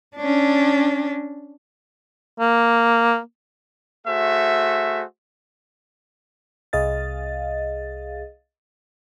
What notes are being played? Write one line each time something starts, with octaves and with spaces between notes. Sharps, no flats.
C#4 D4
A#3
A3 F#4 G#4 C5 E5
C2 G#4 D#5 F5 A6